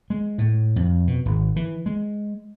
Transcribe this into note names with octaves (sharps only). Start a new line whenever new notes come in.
G#3
A2
F2
B2
G#1
E3
G#3